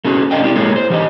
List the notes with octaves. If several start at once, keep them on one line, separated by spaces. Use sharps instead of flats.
A3 C#4 F#4 G#4
D4 D5 D#5 F5 G5
C4 E4 G4 C5 D5
G#3 A#3 D#4 G#4 A4 C#5
C5
E3 G4 D#5